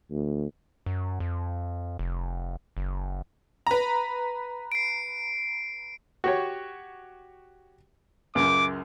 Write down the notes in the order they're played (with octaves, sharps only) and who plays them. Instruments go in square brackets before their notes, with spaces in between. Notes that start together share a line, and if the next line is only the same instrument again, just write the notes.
[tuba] D2
[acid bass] F#2
F2
F1
F#1
[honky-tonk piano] B4 A#5
[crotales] C7 D7
[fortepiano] F#4 G4 C#5
[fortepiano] C#2 F#2 [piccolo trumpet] D6